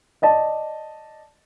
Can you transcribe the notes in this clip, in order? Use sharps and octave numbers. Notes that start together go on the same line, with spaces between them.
D5 D#5 A5